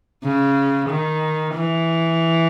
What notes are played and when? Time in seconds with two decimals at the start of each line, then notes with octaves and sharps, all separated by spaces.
0.24 C#3
0.89 D#3
1.55 E3